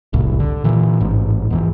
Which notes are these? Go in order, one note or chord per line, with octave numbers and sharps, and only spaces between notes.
E1 C2 A2
D3
A#2 E3
A1 G#2
E2 G#2 E3